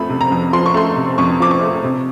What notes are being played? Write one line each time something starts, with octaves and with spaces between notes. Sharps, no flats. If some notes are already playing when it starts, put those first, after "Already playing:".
Already playing: F2 F3 A3 B5
C3
A#5
F2
F3 C6
C#6
A3 C6
C3
F2 C#6
F3 D6
C#6
A3
C3